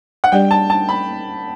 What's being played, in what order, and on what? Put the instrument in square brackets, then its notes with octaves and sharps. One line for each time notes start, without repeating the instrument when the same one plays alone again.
[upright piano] F#5
[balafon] G3 D4 G4 D5 [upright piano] G5
[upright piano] A5
A5
B5